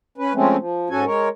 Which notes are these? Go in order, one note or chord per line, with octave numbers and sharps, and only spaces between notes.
C#4 B4
F3 G#3 A3 C4 C#4
F3
G#2 C#4 F#4 A4 G#5
G#3 A#4 C#5